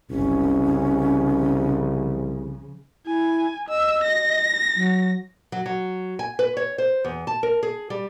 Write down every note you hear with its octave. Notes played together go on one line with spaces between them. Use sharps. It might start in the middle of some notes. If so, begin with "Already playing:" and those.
F#1 C2 C#4
C#3 F3
E4 G#5
D#5 E6
A#6
F#3
F#3
F#3
G#5
B4
C#5
C5
E2
A5
A#4
G#4
G3